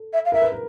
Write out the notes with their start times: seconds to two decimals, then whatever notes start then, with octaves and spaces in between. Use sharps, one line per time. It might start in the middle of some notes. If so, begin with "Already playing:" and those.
Already playing: A4
0.13 E5
0.25 F5
0.32 A#4 E5
0.42 B4
0.52 A#4